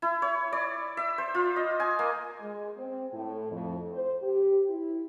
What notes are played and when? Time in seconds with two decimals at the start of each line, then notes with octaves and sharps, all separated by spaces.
0.02 E4
0.22 C#5
0.53 D5
0.97 E5
1.18 C5
1.35 F4
1.56 D#5
1.80 G#5
1.99 A#3
2.40 G#3
2.78 C4
3.13 A2
3.52 F2
3.92 C5
4.22 G4
4.69 E4